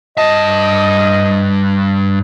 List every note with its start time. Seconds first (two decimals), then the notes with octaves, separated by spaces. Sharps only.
0.18 G2 D#5 A5